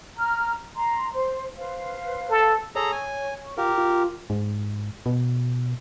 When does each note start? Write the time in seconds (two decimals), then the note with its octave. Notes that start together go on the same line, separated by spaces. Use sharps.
0.17 A#5 F6
0.76 A#5 C6
1.14 C5
1.56 B4 C5 F5
2.30 A4
2.76 G#4 A4 C#5 A#5
2.92 G#5
3.58 F4 G4 A#4
3.78 F4
4.30 G#2
5.06 B2